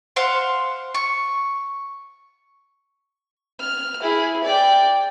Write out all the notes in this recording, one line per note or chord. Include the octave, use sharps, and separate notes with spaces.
C5 F5 F#5 C6
C#6
F6
E4 G#4
D5 G5